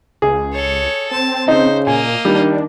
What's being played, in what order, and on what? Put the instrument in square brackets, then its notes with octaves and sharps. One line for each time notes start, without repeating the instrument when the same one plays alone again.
[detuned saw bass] C#2 [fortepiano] G#4
[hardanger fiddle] A4 C#5
[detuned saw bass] C4 [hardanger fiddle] A5
[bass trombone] C#3 [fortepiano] D#4 [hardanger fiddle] C5
[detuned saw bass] A#2 [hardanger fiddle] A#3 D#5 [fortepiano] G#5
[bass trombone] D#3 [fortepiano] G3 [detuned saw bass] D4